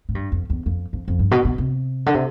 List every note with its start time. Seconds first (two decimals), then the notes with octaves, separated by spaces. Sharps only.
0.09 A2
0.15 G2
0.32 F2
0.50 E2
0.66 F2
0.93 F2
1.08 F2
1.19 G2
1.31 B2
1.45 B2
1.58 C3
2.06 D3
2.14 C3